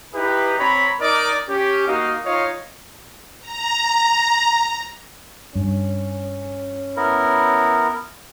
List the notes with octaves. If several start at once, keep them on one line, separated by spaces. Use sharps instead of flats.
D#4 E4 G4 B4
C4 C#5 A#5 B5
D#4 A#4 D5 D#5 D6
C#4 G4
A#3 D#4 F#4 D#5 F5
D#4 F4 C#5 D#5 F5
A#5
G2 C#4
B3 E4 A#4